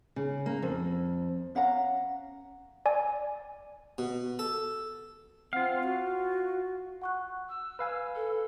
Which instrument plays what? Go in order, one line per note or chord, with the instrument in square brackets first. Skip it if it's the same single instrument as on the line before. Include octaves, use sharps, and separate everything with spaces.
[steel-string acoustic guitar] C#3
A#3
F2
[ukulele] C#4 F5 F#5 A#5
[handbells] D5 G#5
[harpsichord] B2
A4
[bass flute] C4 [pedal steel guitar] F4 F5 [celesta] F#5
[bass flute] F#4
[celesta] F#5 C#6 F#6
[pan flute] E6
[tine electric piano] B4 F5 G#5
[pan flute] A4